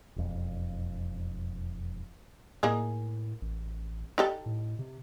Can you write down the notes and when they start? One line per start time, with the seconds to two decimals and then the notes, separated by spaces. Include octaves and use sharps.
0.16 E1 F2
2.63 A2 A#3 D#4 G#4
3.42 A1
4.18 D#4 G4 A4
4.46 A2
4.79 C3